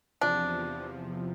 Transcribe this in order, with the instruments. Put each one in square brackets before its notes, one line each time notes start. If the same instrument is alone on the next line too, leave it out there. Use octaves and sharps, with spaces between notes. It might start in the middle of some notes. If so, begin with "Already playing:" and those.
[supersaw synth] E2 C3 F3 [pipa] D4